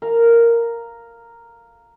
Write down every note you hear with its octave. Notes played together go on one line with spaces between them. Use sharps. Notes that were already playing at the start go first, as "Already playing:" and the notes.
A#4 F5